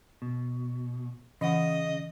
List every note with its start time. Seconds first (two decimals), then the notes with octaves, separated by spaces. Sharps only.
0.22 B2
1.41 C#3 E3 D#5 F#5